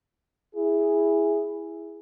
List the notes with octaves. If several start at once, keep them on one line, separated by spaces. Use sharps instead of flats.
E4 G#4